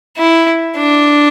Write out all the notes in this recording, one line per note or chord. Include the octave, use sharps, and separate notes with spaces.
E4
D4